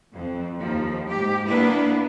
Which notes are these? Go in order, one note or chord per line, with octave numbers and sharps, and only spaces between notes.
F2
D#2 F3
G#2 G4
A#3 B3 D4 E4 B4